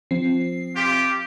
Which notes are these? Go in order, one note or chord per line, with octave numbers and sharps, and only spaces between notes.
F3 C4 C7
F4 G4